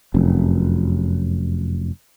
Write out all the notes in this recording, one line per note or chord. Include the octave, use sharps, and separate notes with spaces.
F1 F#2